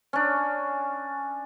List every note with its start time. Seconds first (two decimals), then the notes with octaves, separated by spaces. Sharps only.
0.13 C#4 D4